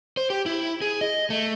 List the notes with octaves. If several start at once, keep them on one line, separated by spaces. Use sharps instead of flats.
C5
G4
E4
G#4
D#5
A3